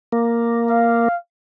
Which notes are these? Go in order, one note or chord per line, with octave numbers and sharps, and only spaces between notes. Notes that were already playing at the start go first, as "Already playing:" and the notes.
A#3
F5